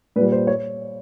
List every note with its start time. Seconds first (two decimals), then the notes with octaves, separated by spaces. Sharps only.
0.16 A#2 B4
0.21 G3
0.32 C5
0.47 C#5